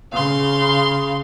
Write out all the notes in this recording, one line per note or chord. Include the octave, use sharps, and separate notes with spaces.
C#3 F5 C6